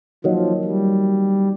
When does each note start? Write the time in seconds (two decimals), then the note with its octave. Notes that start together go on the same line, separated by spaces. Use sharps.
0.24 D#3 F3 F#3 A#3
0.64 G3